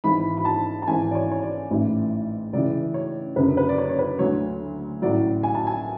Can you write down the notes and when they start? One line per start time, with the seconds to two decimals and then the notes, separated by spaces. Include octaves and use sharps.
0.04 G#1 G#2 E3 B5
0.37 B5
0.45 A5
0.82 A5
0.87 G#1 G#2 E3 G#5
1.11 D5
1.15 C#5
1.31 C#5
1.43 D5
1.71 A1 G#2 E3
2.53 C#2 C#3 E3 D5
2.94 C#5
3.36 F#1 F#2 D3 B4
3.57 B4
3.69 D5
3.78 C#5
3.89 C#5
3.99 B4
4.19 D2 D3 F#3 C#5
5.02 A1 A2 F#3 D5
5.43 G#5
5.55 A5
5.67 G#5